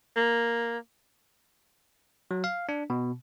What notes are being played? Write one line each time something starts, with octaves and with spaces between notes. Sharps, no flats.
A#3
F#3
F5
D4
B2